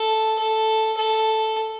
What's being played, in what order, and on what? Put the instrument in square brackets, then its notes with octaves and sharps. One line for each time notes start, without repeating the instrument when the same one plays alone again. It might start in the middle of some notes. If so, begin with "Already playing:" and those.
Already playing: [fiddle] A4
A4
A4